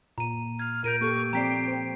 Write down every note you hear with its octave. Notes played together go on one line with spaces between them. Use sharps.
A#2 A#5 D#7
F6 G#6
A#2 A#4 G6 D7 D#7
A#3 G4 A4 C#6
F3 C4 D5 G5 A#5 B6 C7
C5